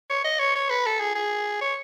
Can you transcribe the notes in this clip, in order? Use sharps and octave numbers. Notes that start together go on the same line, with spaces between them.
C#5
D#5
C#5
C#5
B4
A4
G#4
G#4
C#5